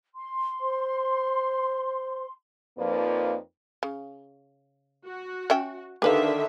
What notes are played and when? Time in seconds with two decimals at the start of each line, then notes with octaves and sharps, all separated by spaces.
0.15 C6
0.61 C5
2.78 F2 F3 A#3 D#4 B4 D5
3.83 C#3
5.05 F#4
5.50 C#4 E5 G5
6.02 D3 D#3 G4 B4 E5 F5